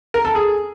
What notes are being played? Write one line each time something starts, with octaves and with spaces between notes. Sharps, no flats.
A#4
A4
G#4